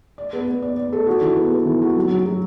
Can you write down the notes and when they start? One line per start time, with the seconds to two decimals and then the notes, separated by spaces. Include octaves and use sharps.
0.18 D5
0.33 B3
0.47 B3
0.62 D5
0.77 D5
0.93 A4
1.07 F#4
1.21 E3
1.36 B3
1.52 B3
1.66 E3
1.82 F#4
1.96 F#3
2.11 F#3
2.26 F#3